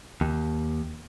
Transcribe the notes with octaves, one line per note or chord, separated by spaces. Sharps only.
D#2